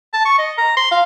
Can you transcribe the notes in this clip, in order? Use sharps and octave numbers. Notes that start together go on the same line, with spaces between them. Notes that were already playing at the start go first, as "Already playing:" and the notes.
A5
C#6
D#5
A#5
C6
F5